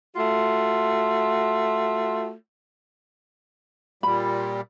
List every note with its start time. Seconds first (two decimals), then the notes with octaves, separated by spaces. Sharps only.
0.16 A3 F4 F#4
4.03 A#2 G3 B5